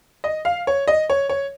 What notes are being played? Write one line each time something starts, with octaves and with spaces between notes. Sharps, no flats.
D#5
F5
C#5
D#5
C#5
C#5